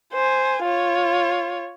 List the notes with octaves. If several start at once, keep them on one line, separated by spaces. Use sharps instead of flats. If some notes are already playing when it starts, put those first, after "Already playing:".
C5 G#5
F4 C#5